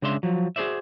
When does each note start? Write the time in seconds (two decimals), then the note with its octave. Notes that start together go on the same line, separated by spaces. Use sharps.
0.02 C#3 G#3 D4 E5 C6
0.23 F3 F#3
0.56 F#4 G#4 A#4 C5 D5 E5